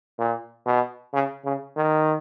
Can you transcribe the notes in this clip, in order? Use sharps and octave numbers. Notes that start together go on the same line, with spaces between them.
A#2
B2
C#3
C#3
D#3